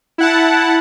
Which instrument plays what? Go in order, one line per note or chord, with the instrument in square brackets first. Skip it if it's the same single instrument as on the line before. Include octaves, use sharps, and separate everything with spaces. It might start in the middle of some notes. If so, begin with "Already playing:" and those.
[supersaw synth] E4 F#5 A5